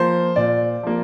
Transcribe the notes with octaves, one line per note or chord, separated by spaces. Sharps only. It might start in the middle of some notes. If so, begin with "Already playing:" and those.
Already playing: F3 A#3 C5
A#2 D5
F3 A#3